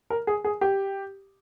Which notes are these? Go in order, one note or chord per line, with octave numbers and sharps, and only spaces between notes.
A#4
G#4
G#4
G4